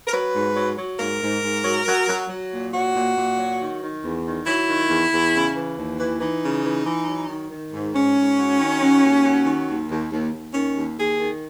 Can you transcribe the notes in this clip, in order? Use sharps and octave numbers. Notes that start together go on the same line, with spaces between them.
A#4
F#3 B4
G#2
F#3
F#3
G#2 A#4
G#2
G#2
F#3
F#3
F#3
F#3
A#2
F#3 F#4
A#2
A#2
F#3
D#3
D#3
E2
D#3
F#3 E4
D#3
E2
E2
C#3
E3
D#2
E3
E3 D#4
C#3
E3
E3
F#3
D#3
D#3
G#2
G#2 C#4
G#2
F#3
D#3
F#3
D#2
F#3
D#3
D#2
D#2
D#2
D#2
D#3 C#4
D#2
D#2 G#4
D#3